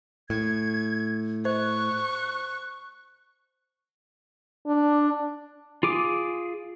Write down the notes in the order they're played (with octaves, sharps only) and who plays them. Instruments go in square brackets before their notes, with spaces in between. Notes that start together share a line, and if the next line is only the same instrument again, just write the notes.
[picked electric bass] A2 [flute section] G#6
[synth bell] C5 [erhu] C#6 [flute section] F#6
[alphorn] D4
[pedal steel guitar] F4 G#4 D6